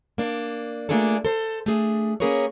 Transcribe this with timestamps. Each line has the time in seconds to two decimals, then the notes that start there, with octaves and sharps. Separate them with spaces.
0.18 A#3 D4
0.89 A3 A#3 D4 F4 G#4 A4
1.25 A4 C5
1.66 A3 D4 G#4
2.20 A#3 C#4 G#4 A#4 B4 C#5